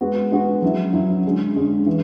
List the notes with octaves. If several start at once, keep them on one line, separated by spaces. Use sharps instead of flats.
G#3 B3 F#4
G#3 B3 F#4
F#3 C#4 E4
F#3 C#4 E4
D3 G#3 C#4
D3 G#3 C#4
E3